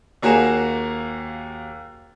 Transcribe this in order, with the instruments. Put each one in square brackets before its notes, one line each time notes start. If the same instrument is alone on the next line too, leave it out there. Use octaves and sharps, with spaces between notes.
[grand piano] D#2 A#3 F#4 G#4 A#5 E7